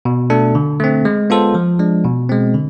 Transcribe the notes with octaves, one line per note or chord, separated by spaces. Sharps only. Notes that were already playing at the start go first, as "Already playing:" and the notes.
B2
A3 D4 A4
D3
A3 C4
G#3
B3 F4 A4 C5
F3
G#3 D4
B2
G#3 C4
D3